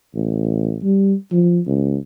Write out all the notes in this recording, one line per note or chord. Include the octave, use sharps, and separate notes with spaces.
A1
G3
F3
C#2